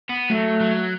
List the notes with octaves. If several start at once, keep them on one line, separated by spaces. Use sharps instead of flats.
B3
F#3 A3
F#3